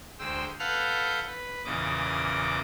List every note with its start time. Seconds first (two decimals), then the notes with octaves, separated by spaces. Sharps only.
0.19 D2 G#3 C5 G5 E6
0.59 A4 B4 F5 F#5 F6 G6
1.27 B4
1.65 E2 A#2 C#3 D#5 D6